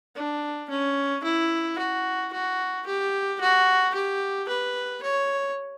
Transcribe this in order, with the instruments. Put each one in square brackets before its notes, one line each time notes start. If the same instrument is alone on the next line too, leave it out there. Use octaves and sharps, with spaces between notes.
[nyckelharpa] D4
C#4
E4
F#4
F#4
G4
F#4
G4
B4
C#5